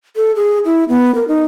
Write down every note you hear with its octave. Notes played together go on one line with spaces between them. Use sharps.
A4
G#4
E4
B3
A#4
D#4